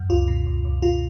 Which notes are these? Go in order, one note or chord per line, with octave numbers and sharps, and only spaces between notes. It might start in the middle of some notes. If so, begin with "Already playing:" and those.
Already playing: F#2
C#2 F4
B2
C#2
C#2
B2 F4